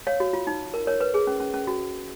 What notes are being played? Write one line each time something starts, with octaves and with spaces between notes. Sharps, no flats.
C#5 F5
F#4
F4
D#4
A#4
A#4 C#5
B4
G#4
C#4
C#4
C#4
F#4